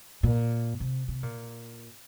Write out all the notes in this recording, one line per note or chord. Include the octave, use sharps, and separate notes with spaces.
A#2
C3
C3
A#2